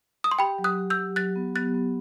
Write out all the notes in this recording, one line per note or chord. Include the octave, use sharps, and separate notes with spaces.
D#6
C6
G4 G5 B5
F#3
D#6 F#6
G4
E6 G6
G4
F#3 F#6 A6
B3
B3 F#6 A6
B3